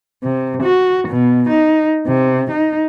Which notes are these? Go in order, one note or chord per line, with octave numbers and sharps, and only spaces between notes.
C3
F#4
B2
D#4
C3
D#4